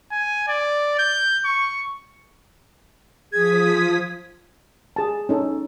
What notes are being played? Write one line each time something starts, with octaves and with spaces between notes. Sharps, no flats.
G#5
D5
G6
C#6
F3 G#4 D#6 G#6 B6
G#4 A5
C#4 D#4 A4